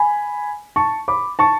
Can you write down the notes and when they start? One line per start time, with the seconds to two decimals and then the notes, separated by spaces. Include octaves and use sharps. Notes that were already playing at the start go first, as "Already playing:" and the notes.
Already playing: G#5 B5
0.76 A5 C#6
1.08 B5 D6
1.39 A5 C#6